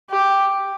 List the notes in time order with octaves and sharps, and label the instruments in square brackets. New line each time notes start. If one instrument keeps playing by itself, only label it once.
[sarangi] G4